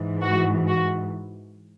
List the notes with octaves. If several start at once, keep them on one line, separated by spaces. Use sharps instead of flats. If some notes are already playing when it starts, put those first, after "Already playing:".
Already playing: G#2 E3
F#4
F#4